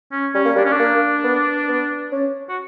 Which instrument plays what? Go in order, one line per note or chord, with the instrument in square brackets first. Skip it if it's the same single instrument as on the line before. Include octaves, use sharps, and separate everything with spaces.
[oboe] C#4
[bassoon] G3 [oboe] C#4
[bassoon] A#3
[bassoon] G3 [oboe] D4
[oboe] C#4
D4
[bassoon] A#3
B3
B3
C#4
[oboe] F#4